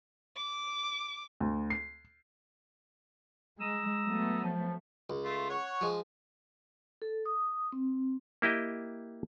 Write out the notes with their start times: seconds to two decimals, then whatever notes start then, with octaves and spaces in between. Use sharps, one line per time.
0.37 D6
1.40 D2
1.70 C7
3.59 G#3 A#5 D#6 E6
4.03 F#3 A3 B3
4.43 F3
5.10 C#2
5.24 A3 F4
5.50 C#5 F#5 C#6
5.81 F3 G#3
7.02 A4
7.26 D#6
7.72 C4
8.42 A#3 E4 G4 D#5 G5